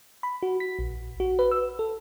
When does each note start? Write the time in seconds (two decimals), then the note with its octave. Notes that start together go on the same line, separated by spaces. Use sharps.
0.23 B5
0.42 F#4
0.60 B6
0.79 A#1
1.20 F#4
1.39 B4
1.51 E6
1.79 A4